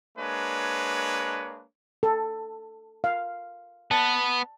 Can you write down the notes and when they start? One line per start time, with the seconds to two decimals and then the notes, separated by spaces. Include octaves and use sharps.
0.17 G#3 A#3 D4 B4 C#5
2.03 A4
3.04 F5
3.91 B3 A5